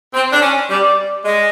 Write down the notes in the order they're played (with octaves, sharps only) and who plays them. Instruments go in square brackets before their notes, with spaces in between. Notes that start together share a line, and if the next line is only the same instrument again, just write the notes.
[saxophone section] C4
D4
C#4
[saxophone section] G3 [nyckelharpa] D5
[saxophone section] G#3